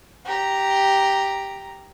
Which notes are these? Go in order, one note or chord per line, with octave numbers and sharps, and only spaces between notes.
G4 A#5